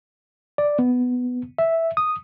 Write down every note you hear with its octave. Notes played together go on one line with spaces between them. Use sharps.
D5
B3
E5
D#6